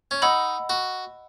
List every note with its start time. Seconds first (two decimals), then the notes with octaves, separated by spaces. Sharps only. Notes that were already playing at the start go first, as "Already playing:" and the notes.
0.11 C#4
0.22 D#4 D#5 F#5 B5 E6
0.69 F#4